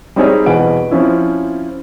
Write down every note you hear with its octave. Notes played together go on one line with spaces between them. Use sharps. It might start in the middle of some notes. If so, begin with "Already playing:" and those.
G3 C4 D#4 G#4 C#5 D#5
E2 B2 B4 F#5 D7
F3 C4 C#4 E4